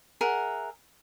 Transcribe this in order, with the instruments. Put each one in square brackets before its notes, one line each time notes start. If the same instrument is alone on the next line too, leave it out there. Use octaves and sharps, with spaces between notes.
[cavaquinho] G#4 A#4 E5 F#5